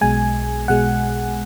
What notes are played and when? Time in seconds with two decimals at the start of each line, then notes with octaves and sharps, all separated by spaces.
0.01 B1 B2 G#3 G#5
0.68 B1 B2 G#3 F#5